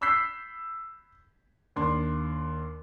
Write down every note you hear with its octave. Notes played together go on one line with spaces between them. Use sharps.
B5 E6 F#6 G6 B6 C7
D#2 D4 C6